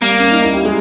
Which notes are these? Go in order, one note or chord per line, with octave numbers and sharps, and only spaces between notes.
G3 A#3 G4
C#4
D#4
E4
G4
G#3 G#4